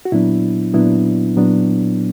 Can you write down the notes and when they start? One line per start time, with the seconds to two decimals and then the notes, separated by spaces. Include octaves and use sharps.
0.05 F#4
0.12 A#2 F#3 B3 D4 E4
0.73 A#2 F#3 B3 D4 E4
1.36 A#2 F#3 B3 D4